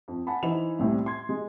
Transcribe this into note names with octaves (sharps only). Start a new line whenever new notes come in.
F2
F#5 G#5 A5 B5
E3 D#4 C5 B5 F7
C2 A2 G3 C4
C6 G#6
G#3